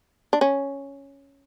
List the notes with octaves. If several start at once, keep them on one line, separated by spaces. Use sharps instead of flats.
D4
C#4